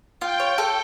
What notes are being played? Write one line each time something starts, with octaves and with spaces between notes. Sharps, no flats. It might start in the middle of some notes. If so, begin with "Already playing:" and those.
F4 G5
C#5
A4